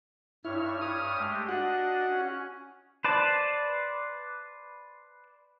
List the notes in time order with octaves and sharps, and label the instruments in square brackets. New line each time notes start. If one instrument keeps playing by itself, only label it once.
[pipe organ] G2 C#5 F6 [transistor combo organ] E4
[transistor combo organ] D#6
[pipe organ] G#3 A3 G4
[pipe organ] D4 D#5 [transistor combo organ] F#4 F#5
[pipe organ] C#4
[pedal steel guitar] B4 C5 D5 A5